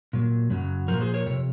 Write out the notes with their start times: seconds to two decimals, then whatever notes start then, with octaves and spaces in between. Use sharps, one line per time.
0.13 A#2 F#3
0.50 F#2 C#3 F#3
0.88 A#2 F3 F#4 A#4
1.01 G#4 C5
1.14 A#4 C#5
1.26 F2 C3 C#5